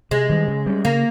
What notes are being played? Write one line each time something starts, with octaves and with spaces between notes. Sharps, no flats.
C3 G#3
D#3 G3
C#3
G3 C#4
C#3 A#3